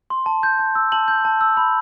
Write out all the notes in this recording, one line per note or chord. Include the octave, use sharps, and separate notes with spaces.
C6
A5
G6
A5
E6
A5 F#7
G6
A5
E6
B5